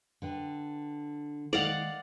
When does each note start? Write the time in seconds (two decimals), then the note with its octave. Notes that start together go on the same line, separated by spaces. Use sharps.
0.22 D3 B4 G5
1.53 D#3 G#3 D5 F5 F#5